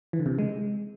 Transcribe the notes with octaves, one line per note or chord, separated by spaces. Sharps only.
E3
D3
C3
C#3
G#3